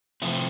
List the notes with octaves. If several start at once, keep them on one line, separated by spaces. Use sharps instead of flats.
C3 F3 A3 C4 E4